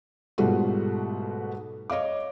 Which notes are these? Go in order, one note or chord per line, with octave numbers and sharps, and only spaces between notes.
G#2 B2 G3 A3 F4 F#4
C#5 D#5 F5 D6